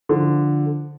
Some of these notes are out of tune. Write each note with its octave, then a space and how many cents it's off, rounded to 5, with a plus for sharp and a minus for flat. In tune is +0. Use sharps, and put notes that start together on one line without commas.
D3 +0 F3 +0